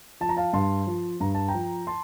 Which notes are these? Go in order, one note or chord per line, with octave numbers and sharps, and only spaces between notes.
F3 A5
A#5
F5 A5
G2 A5 C6
F3
G2 A#5
A5
G5 A#5
F3
A5 C6